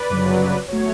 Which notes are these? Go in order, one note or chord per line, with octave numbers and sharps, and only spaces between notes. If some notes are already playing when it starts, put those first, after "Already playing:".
Already playing: B4 D5
G1 F#2 C#3 F#3
G1 F#3 A3 C#5